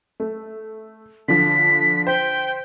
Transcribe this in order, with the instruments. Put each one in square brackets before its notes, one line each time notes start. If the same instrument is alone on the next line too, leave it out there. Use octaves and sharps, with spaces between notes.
[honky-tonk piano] A3
[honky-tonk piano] D3 F3 [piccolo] B6
[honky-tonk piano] C5 [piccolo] G5